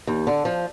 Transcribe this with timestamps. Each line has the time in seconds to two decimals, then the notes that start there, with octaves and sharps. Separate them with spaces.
0.07 D#2
0.27 D3
0.45 F3